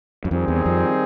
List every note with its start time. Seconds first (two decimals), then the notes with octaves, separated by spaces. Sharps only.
0.25 F#2
0.31 F2 D#3 G3 C4 D#4 G#4
0.48 E2
0.66 F2